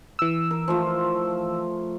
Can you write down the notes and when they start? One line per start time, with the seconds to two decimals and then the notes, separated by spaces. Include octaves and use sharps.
0.19 E3 E6
0.51 A#4
0.68 F3 A3 F4